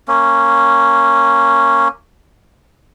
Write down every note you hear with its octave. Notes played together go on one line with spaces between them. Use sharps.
A#3 C#4